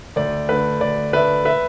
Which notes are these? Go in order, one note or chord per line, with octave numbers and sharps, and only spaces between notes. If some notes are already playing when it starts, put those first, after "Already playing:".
D2 D5
D3 A3 D4 B4
D2 D5
D3 A3 D4 B4 E5
B4 E5